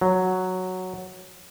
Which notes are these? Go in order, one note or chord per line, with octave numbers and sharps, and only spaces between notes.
F#3